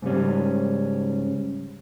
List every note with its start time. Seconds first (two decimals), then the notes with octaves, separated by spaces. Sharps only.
0.02 G#2 C#3 G3 C#4